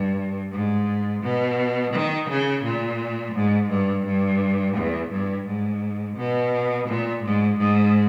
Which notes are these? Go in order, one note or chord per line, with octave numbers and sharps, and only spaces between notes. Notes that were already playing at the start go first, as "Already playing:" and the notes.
Already playing: G2
G#2
B2
D#3
C#3
A#2
G#2
G2
G2
E2
G2
G#2
B2
A#2
G#2
G#2